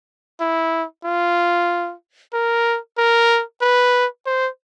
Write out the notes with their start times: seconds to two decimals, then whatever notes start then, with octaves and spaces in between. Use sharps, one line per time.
0.40 E4
1.04 F4
2.33 A#4
2.98 A#4
3.61 B4
4.26 C5